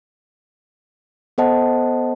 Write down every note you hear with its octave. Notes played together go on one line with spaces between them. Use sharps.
B3 A4 C5 D#5 F#5 A5